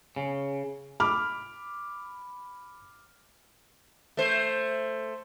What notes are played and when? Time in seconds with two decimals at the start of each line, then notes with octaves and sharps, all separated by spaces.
0.16 C#3
1.00 B5 D6 F6
4.17 A3 C5